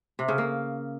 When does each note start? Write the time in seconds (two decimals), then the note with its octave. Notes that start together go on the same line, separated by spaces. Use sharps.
0.19 C3
0.28 C#3
0.38 A#3